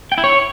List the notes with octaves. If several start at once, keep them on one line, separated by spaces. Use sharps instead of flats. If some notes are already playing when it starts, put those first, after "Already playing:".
G5
E4
C#5